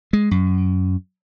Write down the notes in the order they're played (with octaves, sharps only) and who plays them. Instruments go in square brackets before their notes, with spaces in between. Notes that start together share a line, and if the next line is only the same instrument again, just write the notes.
[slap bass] G#3
F#2